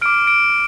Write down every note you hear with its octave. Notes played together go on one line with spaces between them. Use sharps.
D6 F6 D7
D7